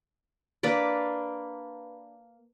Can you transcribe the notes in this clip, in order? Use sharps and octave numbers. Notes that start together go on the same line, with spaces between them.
A#3 D4 B4 D5